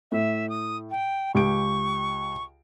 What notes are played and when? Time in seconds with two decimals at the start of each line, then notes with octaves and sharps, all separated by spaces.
0.12 A2 E5
0.50 D#6
0.91 G5
1.34 C#2 G4 C#6 D7